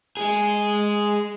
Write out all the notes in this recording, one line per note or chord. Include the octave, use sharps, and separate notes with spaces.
G#3 G#4